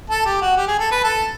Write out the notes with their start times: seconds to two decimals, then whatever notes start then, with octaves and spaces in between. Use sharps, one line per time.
0.10 A4
0.26 G4
0.41 F#4
0.57 G4
0.68 G#4
0.79 A4
0.92 B4
1.04 A4